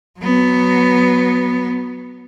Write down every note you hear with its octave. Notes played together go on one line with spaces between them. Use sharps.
F#3 B3